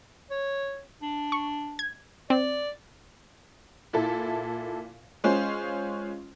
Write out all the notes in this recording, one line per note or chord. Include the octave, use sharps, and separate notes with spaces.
C#5
D4
C#6
G#6
C4 D5
A#2 E4 A4
G#3 C#4 F4 C5